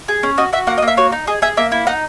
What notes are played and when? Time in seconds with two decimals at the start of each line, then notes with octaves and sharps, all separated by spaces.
0.08 G#4
0.23 C#4
0.38 F#4 D#5
0.53 F#4 E5
0.67 A#3 F#5
0.78 D#5
0.82 A#3
0.88 E5
0.97 F#4 C#5
1.12 D#4
1.27 G#4 D#5
1.42 G#4 E5
1.57 A#3 E5
1.72 E4
1.87 D#4 F#5